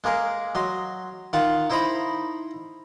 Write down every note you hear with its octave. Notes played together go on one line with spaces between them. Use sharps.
G#3 A#3 G#4 A#4
F#3 D#5 C6
D#3 F4 F5 F#5
D#4 E4 C5 D#5 A#5 B5